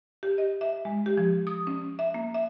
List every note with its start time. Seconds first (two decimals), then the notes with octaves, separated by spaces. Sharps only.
0.23 G4
0.38 D#5
0.61 E5
0.85 G#3
1.06 G4
1.18 F3
1.47 D#6
1.67 C#4
1.99 E5
2.14 A#3
2.34 E5